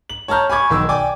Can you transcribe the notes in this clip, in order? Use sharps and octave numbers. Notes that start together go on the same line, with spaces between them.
F#7
C#5 A5 A#5 F6 G6
G#5 B5 C#6 D6 G#6
B1 D#3 E6
D5 G5 G#5 D6